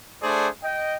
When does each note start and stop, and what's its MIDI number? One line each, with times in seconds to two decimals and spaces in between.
0.22 0.48 57
0.22 0.48 62
0.22 0.48 68
0.22 0.48 72
0.22 0.48 74
0.63 0.96 75
0.63 0.96 79